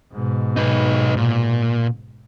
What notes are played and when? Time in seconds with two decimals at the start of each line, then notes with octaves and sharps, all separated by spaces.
0.13 G#2 B2
0.56 D#4 B4
1.17 A#2